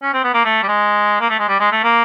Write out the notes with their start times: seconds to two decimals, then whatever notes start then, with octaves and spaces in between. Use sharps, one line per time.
0.03 C#4
0.14 C4
0.24 B3
0.34 A#3
0.45 A3
0.63 G3
0.68 G#3
1.21 A#3
1.29 A3
1.39 G#3
1.48 G3
1.60 G#3
1.72 A3
1.84 A#3